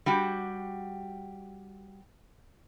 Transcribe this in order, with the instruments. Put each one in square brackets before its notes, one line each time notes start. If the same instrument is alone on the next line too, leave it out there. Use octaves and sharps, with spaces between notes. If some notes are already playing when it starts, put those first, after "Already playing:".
[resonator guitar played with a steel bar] G3 F#4 G4